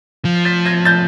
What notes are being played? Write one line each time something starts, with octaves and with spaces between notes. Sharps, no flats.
F3
C7
A6 B6
G#6 A#6
G6 A6